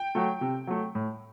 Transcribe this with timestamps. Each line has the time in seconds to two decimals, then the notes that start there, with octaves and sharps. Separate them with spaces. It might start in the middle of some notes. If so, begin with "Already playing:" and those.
Already playing: G5
0.15 F#3 A3
0.41 C3
0.67 F#3 A3
0.95 A2